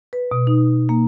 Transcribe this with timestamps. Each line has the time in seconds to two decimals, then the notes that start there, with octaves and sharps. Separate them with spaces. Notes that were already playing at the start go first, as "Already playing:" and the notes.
0.13 B4
0.31 B2
0.47 D#4
0.89 A#3